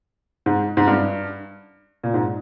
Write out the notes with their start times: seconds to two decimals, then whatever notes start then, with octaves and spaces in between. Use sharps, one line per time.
0.46 G#2
0.77 G#2
0.87 G2
2.04 A#2
2.14 G#2